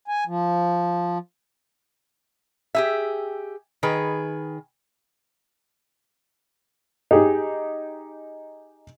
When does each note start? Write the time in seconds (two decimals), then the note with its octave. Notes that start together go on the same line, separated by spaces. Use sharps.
0.08 G#5
0.27 F3
2.75 G4 G#4 E5
3.83 D#3 G#4 B4
7.11 D#4 G4 G#4